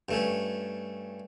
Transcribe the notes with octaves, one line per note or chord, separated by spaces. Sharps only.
G2 A3 C#4